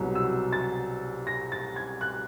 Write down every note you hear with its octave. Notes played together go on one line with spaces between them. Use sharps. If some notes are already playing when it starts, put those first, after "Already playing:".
Already playing: C2 B2 F#3
E6
A6
A#6
A6
G#6
F#6